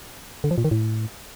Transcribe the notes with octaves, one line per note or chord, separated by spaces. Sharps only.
D3
F3
A#2
D#3
A2